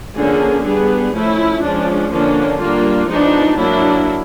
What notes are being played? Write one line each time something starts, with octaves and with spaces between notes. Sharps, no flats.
D3 F3 A#3 C#4 G#4
G3 B3 D4 G#4
F3 A3 C#4 E4
F3 G#3 C#4 D4
D3 F3 A#3 C#4 D4
G3 A#3 D4 F4
F3 G#3 B3 D4 D#4
F#3 A#3 D4 E4